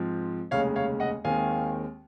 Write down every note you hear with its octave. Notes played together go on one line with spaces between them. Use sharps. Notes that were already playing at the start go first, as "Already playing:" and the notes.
Already playing: G#2 F3 C4
F1 D#2 C#3 G#3 C#5 F5
C#5 F5
D#5 F#5
D#2 D#3 G#3 C4 F5 G#5